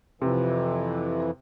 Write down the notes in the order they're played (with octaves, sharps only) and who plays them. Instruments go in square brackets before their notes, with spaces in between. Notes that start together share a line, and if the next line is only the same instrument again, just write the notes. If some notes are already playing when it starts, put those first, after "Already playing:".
[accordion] F2 E3 [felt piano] C3